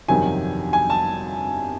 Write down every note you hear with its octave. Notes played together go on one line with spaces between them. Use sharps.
G1 F2 C3 D#3 F#3 G#5
G#5
A5